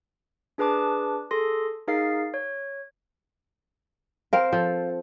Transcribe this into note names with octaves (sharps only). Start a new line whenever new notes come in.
D4 G#4 B4 A5 D6 F#6
G#4 A4 C6 A#6
D#4 G#4 A#4 F5 A6 C7
C#5
C4 A#4 F5
F3 A4